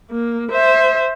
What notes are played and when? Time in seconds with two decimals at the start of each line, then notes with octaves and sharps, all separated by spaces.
0.11 A#3
0.52 C5 E5